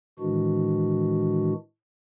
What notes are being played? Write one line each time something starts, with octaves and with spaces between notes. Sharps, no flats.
A2 D#3 E3 G#3 D4 F#4